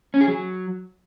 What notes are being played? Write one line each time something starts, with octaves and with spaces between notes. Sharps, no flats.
C#4
G#4
F#3